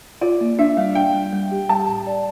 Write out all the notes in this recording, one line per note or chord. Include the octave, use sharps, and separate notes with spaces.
F4 D5
A#3
D4 E5
G3 F5
D4 G5
G3
G3
G4
G3 A5
A2
D5